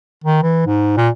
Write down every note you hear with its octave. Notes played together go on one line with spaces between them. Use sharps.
D#3
E3
G#2
A#2